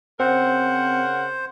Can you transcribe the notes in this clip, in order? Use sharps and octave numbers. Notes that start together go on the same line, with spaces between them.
C#3 C4 A#4 C5 F#5